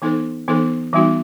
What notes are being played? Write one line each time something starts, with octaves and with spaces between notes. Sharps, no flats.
E3 B3 D#4 A4 C5
E3 B3 D#4 A4 C5
E3 G3 B3 D#4 F#4